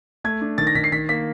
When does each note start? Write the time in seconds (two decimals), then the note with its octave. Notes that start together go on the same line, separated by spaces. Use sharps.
0.24 A3 G#6
0.41 D4
0.58 D#3 A6
0.67 A#6
0.75 D#3 B6
0.84 C7
0.92 D#3 B6
1.09 A#3 B6